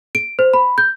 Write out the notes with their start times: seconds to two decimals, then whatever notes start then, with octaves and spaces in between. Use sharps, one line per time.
0.15 D7
0.39 C5
0.54 B5
0.78 G6